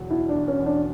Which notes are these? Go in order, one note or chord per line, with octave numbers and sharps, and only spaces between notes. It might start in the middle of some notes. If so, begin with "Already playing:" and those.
Already playing: E1 E2 F#3
B2 E4
D4
E1
C#4
E2
D4